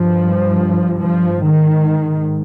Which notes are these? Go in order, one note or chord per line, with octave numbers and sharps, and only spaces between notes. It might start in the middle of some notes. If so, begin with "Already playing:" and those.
Already playing: G2 F3
F3
G#2 D#3